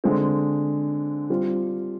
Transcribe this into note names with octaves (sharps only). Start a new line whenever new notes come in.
D3 G#3 C4
G3 C4 F4